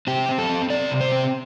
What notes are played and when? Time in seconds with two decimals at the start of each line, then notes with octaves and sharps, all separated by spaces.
0.07 C4 G4
0.29 C4
0.38 A4
0.49 C4
0.70 C4 D5
0.91 C3
1.01 C5
1.12 C4